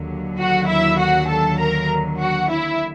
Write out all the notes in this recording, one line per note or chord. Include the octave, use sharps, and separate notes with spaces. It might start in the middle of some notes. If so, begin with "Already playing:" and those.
Already playing: D#2 D3 F#3
F#4 F#5
E4 E5
F#4 F#5
A4 A5
A#4 A#5
F#4 F#5
E4 E5